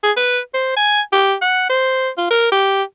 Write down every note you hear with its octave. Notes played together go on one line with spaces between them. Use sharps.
G#4
B4
C5
G#5
G4
F#5
C5
F4
A#4
G4